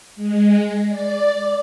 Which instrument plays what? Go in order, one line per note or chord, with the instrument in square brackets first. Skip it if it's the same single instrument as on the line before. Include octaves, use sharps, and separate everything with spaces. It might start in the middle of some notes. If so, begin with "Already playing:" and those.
[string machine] G#3
D5